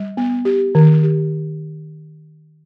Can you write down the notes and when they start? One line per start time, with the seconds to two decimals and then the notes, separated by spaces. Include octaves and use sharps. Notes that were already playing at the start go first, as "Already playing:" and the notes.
Already playing: G3
0.17 B3
0.45 G4
0.75 D#3
1.03 G4